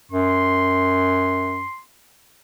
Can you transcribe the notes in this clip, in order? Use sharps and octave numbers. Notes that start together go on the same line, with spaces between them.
F#2 C6